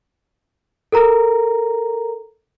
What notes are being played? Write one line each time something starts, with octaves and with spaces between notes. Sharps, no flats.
A4 A#4 A#5